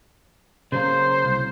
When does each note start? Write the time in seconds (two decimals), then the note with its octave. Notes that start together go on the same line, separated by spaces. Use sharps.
0.72 C#3 F#3 A#3 C5
1.25 C2